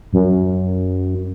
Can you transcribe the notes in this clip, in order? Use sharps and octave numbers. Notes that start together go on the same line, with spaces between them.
F#2